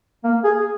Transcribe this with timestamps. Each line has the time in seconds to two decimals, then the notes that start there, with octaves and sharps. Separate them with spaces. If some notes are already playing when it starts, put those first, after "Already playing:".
0.24 A#3
0.44 G#4